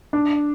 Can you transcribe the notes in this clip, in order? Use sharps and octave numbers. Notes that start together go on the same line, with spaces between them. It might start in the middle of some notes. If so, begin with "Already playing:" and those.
D4